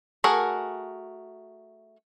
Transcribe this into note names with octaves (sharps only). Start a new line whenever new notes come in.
A3 F#4 G#4 A#4